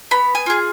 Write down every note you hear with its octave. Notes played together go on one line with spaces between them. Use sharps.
B3 B5
G#5
F4 G#4